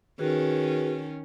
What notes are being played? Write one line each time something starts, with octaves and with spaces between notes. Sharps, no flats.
D#3 C#4 F#4 G#4 B4